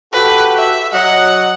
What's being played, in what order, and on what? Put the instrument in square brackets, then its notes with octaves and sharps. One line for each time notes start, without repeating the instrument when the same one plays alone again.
[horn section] F#4 G4 A4 [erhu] B4
[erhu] E5
[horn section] F#3 D#5 [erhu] F#5